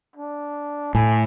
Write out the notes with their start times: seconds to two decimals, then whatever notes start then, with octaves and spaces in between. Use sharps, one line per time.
0.16 D4
0.95 A2 G#5